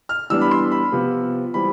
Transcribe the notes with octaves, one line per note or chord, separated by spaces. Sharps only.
F6
E3 G3 B3 D4 E6
B5
C6
B5
C3 F3 B3
E3 G3 C4 B5